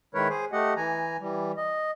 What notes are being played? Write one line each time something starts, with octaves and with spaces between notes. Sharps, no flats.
D#3 G#3 E4 A#4 B4 C#5
G#4 C5
A3 G4 D#5 F#5
E3 G#5 A#5
E3 G3
D#5